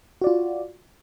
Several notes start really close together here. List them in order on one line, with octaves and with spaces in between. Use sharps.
F#4 D5 F4